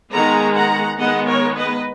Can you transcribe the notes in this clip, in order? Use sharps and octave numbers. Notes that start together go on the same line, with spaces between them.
D#3 G#3 B3 F#5 A#5
F#5 A#5
D#3 G#3 B3 D#5 F#5
A#4 C#5
B4 D#5